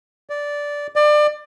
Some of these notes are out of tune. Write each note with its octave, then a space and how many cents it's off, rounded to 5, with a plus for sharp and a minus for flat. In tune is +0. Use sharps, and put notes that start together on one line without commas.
D5 -10
D5 +30